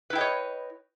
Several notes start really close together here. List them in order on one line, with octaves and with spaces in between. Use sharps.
B4 E4 G5 D#5 C#5